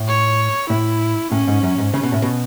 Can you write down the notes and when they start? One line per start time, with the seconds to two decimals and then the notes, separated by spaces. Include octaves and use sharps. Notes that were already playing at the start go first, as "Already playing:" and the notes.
Already playing: A2
0.08 C#5
0.70 A2 E4
1.31 A2 C#4
1.48 G#2
1.63 F#2
1.78 G#2
1.94 C#3 C#4
2.03 B2
2.12 A2
2.22 B2